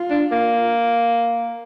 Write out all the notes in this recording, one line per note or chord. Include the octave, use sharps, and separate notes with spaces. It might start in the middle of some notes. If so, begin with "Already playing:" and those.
Already playing: F4
D4
A#3